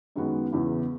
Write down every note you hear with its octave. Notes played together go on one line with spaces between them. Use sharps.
F#2 D#3 G#3 B3 F#4
E2 C#3 E3 B3 E4